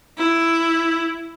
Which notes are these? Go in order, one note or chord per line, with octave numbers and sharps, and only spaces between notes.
E4